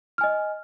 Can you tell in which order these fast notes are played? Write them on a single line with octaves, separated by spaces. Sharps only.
F6 G#5 D#5